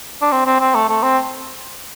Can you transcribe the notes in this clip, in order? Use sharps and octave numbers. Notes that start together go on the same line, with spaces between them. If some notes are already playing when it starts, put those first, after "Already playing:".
D4
C4
C4
C4
A3
A3
C4